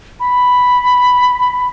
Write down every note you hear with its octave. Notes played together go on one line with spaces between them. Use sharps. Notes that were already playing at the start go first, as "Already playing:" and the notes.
B5